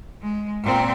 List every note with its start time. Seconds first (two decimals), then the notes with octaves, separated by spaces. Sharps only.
0.22 G#3
0.63 A#2 C4